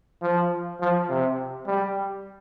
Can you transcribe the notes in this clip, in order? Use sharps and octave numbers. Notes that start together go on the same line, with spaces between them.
F3
F3
C3
G3